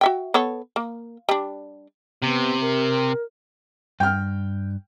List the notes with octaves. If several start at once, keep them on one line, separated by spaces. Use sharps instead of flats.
F#4 E5 G5
B3 A4 C#5
A#3
G3 D4
C3 B3
A#4
G2 G5 F6